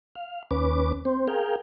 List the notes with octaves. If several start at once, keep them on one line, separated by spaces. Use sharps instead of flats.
F5
D#2 C#4 B4 D6
C4 C5
G#4 A#4 F5 G5